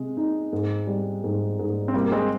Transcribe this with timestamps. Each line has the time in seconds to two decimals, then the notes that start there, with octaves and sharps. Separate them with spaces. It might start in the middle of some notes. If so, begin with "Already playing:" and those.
Already playing: C3 G#3
0.17 D#4
0.53 G#2
0.87 G3
1.24 G#2
1.59 G#2
1.88 C4
1.94 C2 G3 A#3
2.04 A#3
2.12 G#3 C4